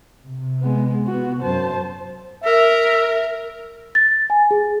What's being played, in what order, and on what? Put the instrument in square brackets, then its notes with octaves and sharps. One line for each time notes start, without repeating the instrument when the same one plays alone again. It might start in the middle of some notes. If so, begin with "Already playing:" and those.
[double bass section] C3
[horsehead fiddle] G#3 B3
B3 F#4
[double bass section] F#2 [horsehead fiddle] C5 A5
[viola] A#4 [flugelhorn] E5
[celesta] A6
G#5
G#4